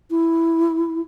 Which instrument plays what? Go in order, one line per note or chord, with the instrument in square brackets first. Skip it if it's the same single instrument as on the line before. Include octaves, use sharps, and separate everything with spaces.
[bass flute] E4